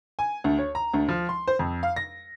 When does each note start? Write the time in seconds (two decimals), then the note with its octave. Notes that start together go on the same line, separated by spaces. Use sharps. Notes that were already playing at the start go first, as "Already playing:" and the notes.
0.19 G#5
0.44 D2
0.59 C#5
0.75 A#5
0.94 D2
1.09 F3
1.29 C6
1.48 C5
1.59 F2
1.83 F5
1.96 A#6